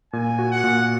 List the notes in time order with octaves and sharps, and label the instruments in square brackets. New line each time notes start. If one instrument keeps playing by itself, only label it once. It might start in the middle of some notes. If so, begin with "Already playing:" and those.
[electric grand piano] A#2 [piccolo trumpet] G#5
[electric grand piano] F#4
[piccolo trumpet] F#5
[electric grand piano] A#2